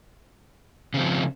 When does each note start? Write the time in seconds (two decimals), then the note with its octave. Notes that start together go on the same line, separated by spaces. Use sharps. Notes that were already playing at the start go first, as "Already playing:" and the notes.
0.94 C#3
0.97 C4
1.00 F3